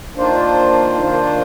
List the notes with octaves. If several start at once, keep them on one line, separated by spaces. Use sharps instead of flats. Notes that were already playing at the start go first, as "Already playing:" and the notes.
D#3 A#3 D4 F4 C5
D#3 A#3 D4 F4 C5